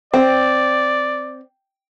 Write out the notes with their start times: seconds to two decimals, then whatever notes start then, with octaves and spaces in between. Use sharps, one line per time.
0.14 C4 D5